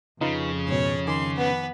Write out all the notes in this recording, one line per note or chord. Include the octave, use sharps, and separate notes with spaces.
F2 C#3 D#4 F4 B4
G#2 B2 C#5
D#3 G#5 C6 D6
B3 B4